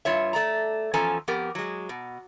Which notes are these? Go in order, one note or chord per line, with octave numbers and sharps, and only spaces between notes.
G2 F4 C#5 E5
A3 D5 A#5
E2 F3 C#4 A4 G#5 A#5
F2 B3 G4 A#4
F#3 G#3
B2